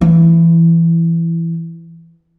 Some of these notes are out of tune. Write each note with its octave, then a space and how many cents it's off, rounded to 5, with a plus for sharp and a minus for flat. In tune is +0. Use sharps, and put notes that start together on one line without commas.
E3 +15 E4 +0